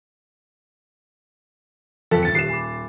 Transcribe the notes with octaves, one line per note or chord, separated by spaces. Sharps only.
F2 D#3 E3 A4 B6
D#1 G2 A6 C#7
D#3 G4 F#6 C7 E7
G#5 B5 D6